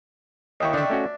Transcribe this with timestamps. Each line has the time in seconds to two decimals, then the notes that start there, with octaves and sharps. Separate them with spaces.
0.61 D#2 E4 D#5 G5 C#6
0.74 D3 D4 E5
0.90 A3 C#4 F#4